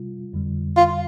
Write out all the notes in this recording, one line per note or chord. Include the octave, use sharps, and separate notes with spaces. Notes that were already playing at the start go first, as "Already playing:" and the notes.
Already playing: C3 G3 F4
F2 D3 G3
F4